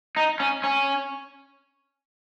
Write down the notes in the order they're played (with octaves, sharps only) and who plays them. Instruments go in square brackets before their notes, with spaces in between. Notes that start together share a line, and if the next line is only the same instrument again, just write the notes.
[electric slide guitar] D#4
C#4
C#4